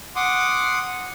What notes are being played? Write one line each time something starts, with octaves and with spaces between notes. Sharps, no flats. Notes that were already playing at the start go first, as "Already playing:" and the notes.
F#5 C6 D6 D#6